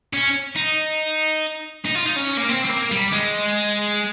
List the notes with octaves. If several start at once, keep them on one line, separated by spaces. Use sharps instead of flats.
C#4
D#4
D#4
F4
D#4
C#4
A#3
C4
C4
A#3
G3
G#3